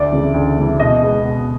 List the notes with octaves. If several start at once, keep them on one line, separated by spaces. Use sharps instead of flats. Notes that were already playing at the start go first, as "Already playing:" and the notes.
Already playing: D2 D5
C#3 E3
D2
C#3 E3
B2 D#5
G#3 B3
B2